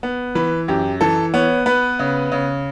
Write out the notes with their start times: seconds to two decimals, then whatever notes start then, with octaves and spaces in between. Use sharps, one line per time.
0.03 B3
0.35 E3 B4
0.68 F#2 G4
1.01 E3 A4
1.34 B3 C#5
1.66 B3 B4
1.99 C#3
2.32 C#3